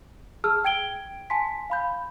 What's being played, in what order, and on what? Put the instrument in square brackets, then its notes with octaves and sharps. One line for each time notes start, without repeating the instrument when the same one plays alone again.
[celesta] G#4 A5 E6 F6
G5 G#6 D7 G7
G#5 A5 C6 B6
F5 B5 G6